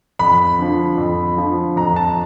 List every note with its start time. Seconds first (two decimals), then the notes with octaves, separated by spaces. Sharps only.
0.19 F2 B5
0.59 D3 F3
0.98 F2
1.37 D3 F3
1.76 F2 A#5
1.96 A5